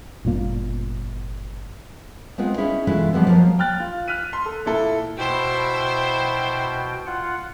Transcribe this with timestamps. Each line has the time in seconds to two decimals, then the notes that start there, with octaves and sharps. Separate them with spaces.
0.25 G1 F#2 A#2 A#3
2.38 G#3 B3 C4 F4
2.58 C#4 D#4 E4 G#4
2.87 B2 E3 G#3 A3 E4 F4
3.13 F3 G3 G#3 B3 C4
3.27 F3 F#3 G#3 A#3
3.59 G5 F6 F#6 A6
3.80 F4
4.08 F6 F#6 B6 D#7
4.33 C6
4.46 A4
4.66 A#2 E4 A4
5.18 B2 E4 C5 G5
7.07 F4 F#5